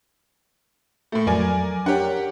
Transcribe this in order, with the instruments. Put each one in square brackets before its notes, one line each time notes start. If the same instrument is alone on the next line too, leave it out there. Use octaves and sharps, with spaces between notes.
[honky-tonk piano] A2 A3
[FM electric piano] F2 F#3 [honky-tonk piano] A#4 D5 G#5
[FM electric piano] D4 A#4 C#5 [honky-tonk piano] G4 F#5